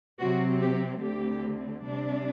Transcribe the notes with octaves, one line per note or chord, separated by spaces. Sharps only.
C3 F#3 C4 F#4
G4
D2 D3 A3 C4 G4
C3 G3 D4